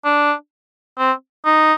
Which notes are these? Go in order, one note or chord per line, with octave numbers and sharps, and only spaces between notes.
D4
C4
D#4